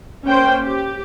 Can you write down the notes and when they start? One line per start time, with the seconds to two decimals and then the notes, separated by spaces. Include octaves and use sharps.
0.24 A#3 C#4 C5 G5
0.63 G4